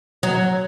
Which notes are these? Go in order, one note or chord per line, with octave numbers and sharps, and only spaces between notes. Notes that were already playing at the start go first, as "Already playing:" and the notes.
F#3